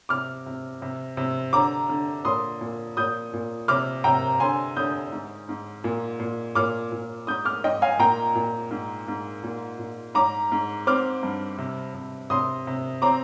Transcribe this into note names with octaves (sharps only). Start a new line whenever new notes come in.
C3 D6 F6
C3
C3
C3
D3 A#5 D6
D3
A#2 C6 D#6
A#2
A#2 D#6 G6
A#2
C3 D6 F6
C3 G5 A#5
D3 G#5 C6
D3 D#6 G6
G#2
G#2
A#2
A#2
A#2 D6 F6
A#2
G#2 D#6 G6
D6 F6
G#2 D#5 G5
F5 G#5
A#2 G5 A#5
A#2
G#2
G#2
A#2
A#2
G#2 A#5 D6
G#2
C4 D6 F6
G2
C3
C3
C3 C6 D#6
C3
C4 A#5 D6